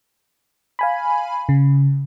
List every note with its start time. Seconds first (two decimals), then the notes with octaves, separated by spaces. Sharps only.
0.79 F5 G#5 B5
1.49 C#3